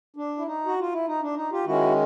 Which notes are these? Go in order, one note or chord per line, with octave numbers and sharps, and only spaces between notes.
D4
E4
D#4
F#4
F4
E4
D#4
D4
D#4
F4 G4
D#3 G#3 C#4 E4 F#4